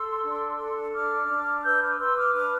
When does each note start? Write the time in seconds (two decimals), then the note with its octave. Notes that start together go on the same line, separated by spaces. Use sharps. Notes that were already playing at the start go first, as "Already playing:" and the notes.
Already playing: A4 C6 E6
0.24 D4
0.59 A4
0.94 D4 D6 F6
1.29 D4
1.58 F6
1.65 B4 E6 G6
1.82 D6 F6
1.99 B4 C6 E6
2.17 D6 F6
2.35 D4 D6 F6